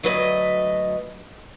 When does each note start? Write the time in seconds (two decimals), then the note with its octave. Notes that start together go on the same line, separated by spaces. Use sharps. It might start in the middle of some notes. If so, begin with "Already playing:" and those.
0.03 D2 F#3 A3 B4 D#5